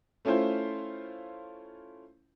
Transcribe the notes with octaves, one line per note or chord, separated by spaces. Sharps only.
A3 C#4 E4 F4 C5